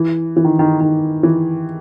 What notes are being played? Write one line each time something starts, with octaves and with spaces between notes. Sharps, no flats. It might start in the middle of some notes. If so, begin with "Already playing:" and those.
Already playing: E3
E3
D#3
D#3
D#3
E3